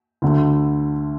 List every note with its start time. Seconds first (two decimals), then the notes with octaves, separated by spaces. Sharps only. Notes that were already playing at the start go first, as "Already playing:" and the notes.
0.22 D2 D3 A3